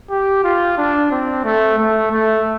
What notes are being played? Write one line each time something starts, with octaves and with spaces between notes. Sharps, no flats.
G4
F4
D4
C4
A3
A3
A3